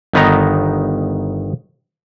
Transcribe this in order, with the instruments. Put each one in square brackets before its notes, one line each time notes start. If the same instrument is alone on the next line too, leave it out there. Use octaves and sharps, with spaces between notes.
[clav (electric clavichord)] G1 D#3 B3 D#4 A#5